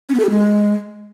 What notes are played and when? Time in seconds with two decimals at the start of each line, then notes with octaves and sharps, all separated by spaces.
0.09 C#4
0.14 B3
0.20 A4
0.25 G4
0.30 G#3